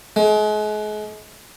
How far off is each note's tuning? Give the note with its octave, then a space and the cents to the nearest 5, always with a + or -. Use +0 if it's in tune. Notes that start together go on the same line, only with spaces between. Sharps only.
G#3 +35